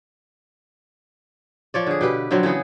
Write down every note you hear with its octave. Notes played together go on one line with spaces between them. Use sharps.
F3 C#5 D5
D3 G#4
B2 G4 B4
D3 F3 F#3 C4
C#3 E3 B3 G#4